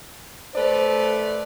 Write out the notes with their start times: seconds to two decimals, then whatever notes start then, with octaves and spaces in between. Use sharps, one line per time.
0.55 A3 B4 C5 D5